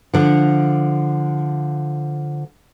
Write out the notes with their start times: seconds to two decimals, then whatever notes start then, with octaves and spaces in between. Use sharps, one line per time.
0.13 D3 F3